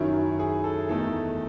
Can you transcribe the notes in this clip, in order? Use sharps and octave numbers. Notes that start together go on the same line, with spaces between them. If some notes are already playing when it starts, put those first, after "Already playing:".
Already playing: F#2 D#3 F#3 C#4 E4
G#4
A4
E2 D#3 A3 D#4 A4